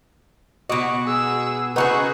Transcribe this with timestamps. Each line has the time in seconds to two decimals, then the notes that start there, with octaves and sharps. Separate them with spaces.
0.70 B2 F#4 D#5 D6
1.05 G#4 E6
1.76 C#4 D#4 F4 F#4 G#4 B4 F#5 C#6